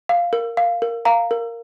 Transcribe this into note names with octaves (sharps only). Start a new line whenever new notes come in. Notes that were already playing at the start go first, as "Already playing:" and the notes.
F5
A#4
F5
A#4
F5 A#5
A#4